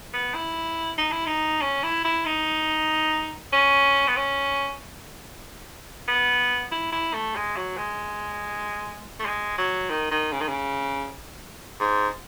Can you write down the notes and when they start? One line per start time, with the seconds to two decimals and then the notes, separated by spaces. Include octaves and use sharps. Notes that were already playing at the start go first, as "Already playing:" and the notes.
0.14 B3
0.34 E4
0.98 D#4
1.12 E4
1.26 D#4
1.62 C#4
1.83 E4
2.04 E4
2.26 D#4
3.53 C#4
4.07 B3
4.16 C#4
6.08 B3
6.72 E4
6.92 E4
7.14 A3
7.36 G#3
7.56 F#3
7.78 G#3
9.20 A3
9.26 G#3
9.58 F#3
9.90 D#3
10.11 D#3
10.32 C#3
10.40 D#3
10.48 C#3
11.80 G#2